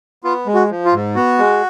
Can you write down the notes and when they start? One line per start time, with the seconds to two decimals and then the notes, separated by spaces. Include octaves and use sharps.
0.24 B3 F4
0.46 G#3
0.54 F#4
0.70 F3
0.85 F4
0.92 G#2
1.15 B3 F#4
1.39 G#3